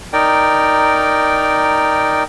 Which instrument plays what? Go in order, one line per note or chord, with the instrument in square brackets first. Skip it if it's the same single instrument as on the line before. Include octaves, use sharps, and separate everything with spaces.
[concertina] D#4 A#4 D5 G5